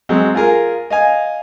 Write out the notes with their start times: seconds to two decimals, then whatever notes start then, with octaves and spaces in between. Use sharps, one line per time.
0.09 F#3 G#3 C4
0.34 F4 G#4 A#4 G#5
0.90 D#5 F5 G#5